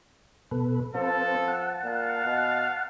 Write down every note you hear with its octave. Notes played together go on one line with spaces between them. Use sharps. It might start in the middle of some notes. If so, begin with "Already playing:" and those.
B2 A4 B4
F3 C4 A4 B4 C5
F#5 A5
A#2 F5
B2